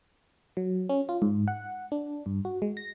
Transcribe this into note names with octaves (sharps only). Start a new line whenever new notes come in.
F#3
C#4
F4
G#2
F#5
D4
G2
F#4
G#3
A#6